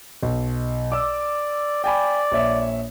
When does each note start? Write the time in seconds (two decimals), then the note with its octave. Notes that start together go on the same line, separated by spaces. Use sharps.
0.23 B1
0.92 D5 D6 E6
1.84 D5 G5 G#5 B5
2.31 A#1 C#5 E5